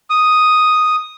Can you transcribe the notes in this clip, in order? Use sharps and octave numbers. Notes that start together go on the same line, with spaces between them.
D#6